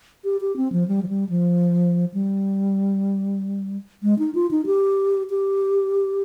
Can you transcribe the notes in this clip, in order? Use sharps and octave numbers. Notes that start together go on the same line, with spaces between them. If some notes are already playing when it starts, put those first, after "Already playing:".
G4
G4
C4
F3
G3
F3
G3
F3
G3
G#3
D#4
F4
D#4
G4
G4